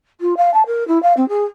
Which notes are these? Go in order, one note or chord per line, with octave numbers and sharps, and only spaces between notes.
F4
F5
A5
A#4
E4
F5
C4
G#4